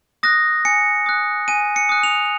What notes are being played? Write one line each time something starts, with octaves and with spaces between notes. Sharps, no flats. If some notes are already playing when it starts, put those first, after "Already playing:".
D#6 F#6 A#6
G#5 C#7
D#6 F#6
G#5 D#7
C#7
D#6 F#6
F7